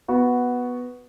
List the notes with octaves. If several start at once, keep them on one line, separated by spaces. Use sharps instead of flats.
B3 F#4 B4